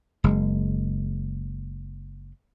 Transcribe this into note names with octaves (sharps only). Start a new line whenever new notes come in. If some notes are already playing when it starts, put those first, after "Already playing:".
F#1 G#3